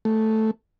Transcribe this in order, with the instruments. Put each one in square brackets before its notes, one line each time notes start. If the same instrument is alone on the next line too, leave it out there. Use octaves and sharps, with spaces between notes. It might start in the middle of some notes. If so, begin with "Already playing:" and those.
[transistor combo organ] A3